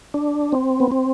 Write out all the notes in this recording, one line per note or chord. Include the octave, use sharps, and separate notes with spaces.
D4
C4
B3
C4